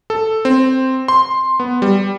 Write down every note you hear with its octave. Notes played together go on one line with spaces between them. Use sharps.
A4
C4
C6
B3
G3